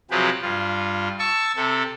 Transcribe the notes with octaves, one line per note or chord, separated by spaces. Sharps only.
C3 F3 F#3 G4 G#4 B4
G2 F4
A5 C#6 E6
C3 A4